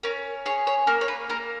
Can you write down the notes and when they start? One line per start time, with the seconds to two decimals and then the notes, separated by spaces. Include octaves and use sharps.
0.03 C#4 A#4
0.46 G#4 C#5
0.67 C#5
0.87 A#3 A#4
1.01 C#5
1.08 B4
1.29 A#3 A#4